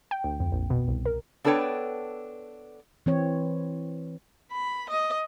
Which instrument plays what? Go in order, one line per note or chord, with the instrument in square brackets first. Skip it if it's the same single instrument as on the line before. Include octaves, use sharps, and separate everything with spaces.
[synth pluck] G5
D2
F2
A#1
B2
C2
A#4
[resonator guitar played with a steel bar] B3 D4 A4 B4 C#5 G5
[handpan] E3 C4 C#5
[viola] B5
D#5